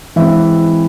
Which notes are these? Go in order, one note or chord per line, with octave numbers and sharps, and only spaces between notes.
E3 G#3 C4 E5
E5